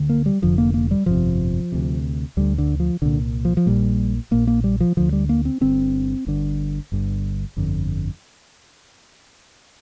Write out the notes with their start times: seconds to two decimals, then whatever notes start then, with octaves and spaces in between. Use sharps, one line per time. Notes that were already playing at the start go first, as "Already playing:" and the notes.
Already playing: D2 D3
0.09 A#3
0.26 G3
0.42 F1 F2 D3 F3
0.58 A#3
0.74 A#3
0.91 G3
1.06 G1 F2 C3 F3
1.72 D2 C3
2.37 D2 D3 G3
2.58 D3
2.80 F3
3.02 C2 A#2 D3
3.45 F3
3.57 F3
3.66 A#1 A#2 G3
4.31 A#1 A#2 A#3
4.47 A#3
4.64 G3
4.80 F3
4.97 D2 D3 F3
5.13 G3
5.29 A#3
5.45 C4
5.61 G1 G2 D3 C4
6.26 G1 G2 D3
6.92 G1 G2 D3
7.56 G1 F2 D3